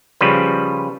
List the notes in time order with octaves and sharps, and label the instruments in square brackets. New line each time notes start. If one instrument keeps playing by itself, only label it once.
[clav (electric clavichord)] C#3 F3 G3 B4